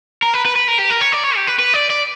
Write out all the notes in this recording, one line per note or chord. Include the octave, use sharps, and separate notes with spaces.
A#4
B4
B4
B4
A#4
G4
A#4
C#5
D5
C#5
G4
B4
B4
D5
D5